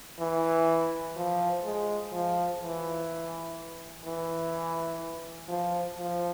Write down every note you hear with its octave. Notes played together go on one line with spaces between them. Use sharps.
E3
F3
G#3
F3
E3
E3
F3
F3